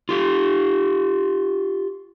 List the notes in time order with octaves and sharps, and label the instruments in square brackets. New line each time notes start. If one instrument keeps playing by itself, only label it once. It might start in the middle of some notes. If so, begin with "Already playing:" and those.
[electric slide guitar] F4 G4